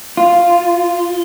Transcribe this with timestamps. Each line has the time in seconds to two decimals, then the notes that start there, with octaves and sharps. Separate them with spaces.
0.17 F4